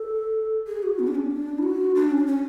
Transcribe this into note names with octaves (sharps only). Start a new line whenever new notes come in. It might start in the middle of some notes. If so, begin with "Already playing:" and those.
Already playing: A4
G#4
F#4
B3
D4
C#4
D4
E4
F#4
D4
C#4
D4
C#4